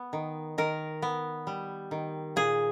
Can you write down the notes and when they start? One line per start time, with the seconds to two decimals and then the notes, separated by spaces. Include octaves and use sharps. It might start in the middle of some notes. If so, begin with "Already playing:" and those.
Already playing: B3
0.13 D#3
0.58 D#3 A#4
1.02 B3
1.47 G3
1.91 D#3
2.36 A#2 G#4